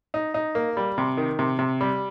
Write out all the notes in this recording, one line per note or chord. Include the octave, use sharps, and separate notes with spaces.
D#4
D#4
A#3
G3
C3
D#3
C3
C3
G3